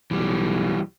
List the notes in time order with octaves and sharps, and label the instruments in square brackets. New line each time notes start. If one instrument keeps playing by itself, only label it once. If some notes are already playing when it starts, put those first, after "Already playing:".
[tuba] B1 [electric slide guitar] E3 G3